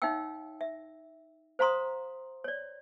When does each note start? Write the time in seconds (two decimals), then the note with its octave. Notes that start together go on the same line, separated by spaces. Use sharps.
0.02 D#4 C#5 E5 F5 G5 E6
0.61 E5
1.59 C5 F5 A#5 C6 D#6
2.44 C#5 D5